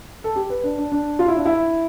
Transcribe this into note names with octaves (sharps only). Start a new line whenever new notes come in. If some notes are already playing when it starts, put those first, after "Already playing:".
A4
G4
B4
D4
D4
D4
F4
E4
D4
E4